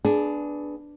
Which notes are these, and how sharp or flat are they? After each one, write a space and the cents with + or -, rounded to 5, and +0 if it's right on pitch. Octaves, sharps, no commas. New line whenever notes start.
B3 +0 D4 +0 G#4 +20